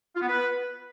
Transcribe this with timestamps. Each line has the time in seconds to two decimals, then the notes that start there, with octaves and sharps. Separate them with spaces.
0.16 F4
0.22 B3
0.28 B4